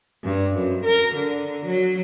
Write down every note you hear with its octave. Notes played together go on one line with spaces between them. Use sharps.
G2
F#2
A#4
D3
F#3